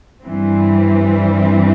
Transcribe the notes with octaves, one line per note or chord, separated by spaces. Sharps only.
G2 E3 G3 C4